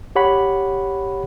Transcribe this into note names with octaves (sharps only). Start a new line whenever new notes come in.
G4 C#5 F#5 B5